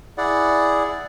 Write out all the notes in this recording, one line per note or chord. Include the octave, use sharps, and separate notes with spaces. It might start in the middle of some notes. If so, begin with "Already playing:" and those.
E4 G#4 D5 F#5